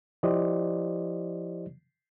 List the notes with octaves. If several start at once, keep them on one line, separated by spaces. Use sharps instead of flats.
F3 E4 G4 C5 D5 D#5